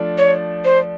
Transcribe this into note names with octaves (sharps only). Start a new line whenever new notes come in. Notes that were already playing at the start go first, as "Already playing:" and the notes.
Already playing: F3 A3 D4
C#5
C5